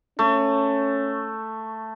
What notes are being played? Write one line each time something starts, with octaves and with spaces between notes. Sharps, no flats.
A3 C#4